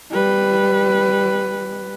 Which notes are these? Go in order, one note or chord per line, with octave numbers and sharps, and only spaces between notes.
G3 B4